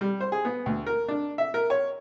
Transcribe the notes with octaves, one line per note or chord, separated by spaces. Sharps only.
G3
C5
G#4
B3
D2
A#4
D4
E5
A#4
C#5